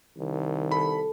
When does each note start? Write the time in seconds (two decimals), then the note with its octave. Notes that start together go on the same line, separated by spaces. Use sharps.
0.18 C2 D#3
0.72 A4 B5